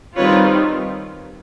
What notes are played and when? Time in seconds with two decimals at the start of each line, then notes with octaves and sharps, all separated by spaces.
0.17 D#3 G3 C4 F4 B4 C#5